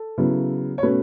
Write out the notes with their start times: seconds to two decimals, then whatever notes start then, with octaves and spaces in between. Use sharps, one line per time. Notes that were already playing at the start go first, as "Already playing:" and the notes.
Already playing: A4
0.18 C#3 F#3 B3 E4
0.78 C#5
0.83 B2 A3 C#4 B4